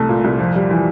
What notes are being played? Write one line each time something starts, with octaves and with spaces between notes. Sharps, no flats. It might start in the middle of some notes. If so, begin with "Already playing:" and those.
Already playing: C2 A3
A#2
C2
F2
G3
E3